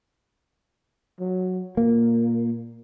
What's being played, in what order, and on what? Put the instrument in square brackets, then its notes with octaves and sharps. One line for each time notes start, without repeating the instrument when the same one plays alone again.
[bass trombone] F#3
[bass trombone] A#2 [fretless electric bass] A#3